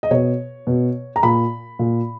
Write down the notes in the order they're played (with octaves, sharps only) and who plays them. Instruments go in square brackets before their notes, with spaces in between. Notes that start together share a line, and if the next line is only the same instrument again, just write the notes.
[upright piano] D#5
B2 C#5
B2
A#5
A#2 B5
A#2